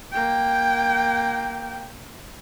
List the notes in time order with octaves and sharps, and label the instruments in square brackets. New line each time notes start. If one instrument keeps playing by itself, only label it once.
[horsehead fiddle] A#3 G5